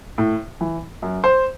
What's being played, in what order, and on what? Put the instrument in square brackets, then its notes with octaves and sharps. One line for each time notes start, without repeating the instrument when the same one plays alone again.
[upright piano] A2
E3
F#2
C5